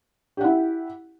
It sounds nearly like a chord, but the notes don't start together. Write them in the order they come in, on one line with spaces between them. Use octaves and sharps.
G4 F#5 E4